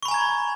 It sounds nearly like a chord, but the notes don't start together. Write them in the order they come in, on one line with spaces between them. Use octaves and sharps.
C#6 B5 G#5 A#5 G#6